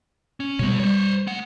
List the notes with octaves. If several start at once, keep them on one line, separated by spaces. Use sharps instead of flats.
C#4
B2 G3 G#3 B3 C#5
G3 C5 C#5
A3 F#5